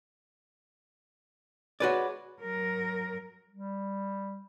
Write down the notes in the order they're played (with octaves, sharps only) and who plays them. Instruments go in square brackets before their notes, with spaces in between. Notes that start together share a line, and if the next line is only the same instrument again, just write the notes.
[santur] G#3 C#5 D6 [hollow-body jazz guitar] F#4 B4 D5
[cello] F#3 A#4
[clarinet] G3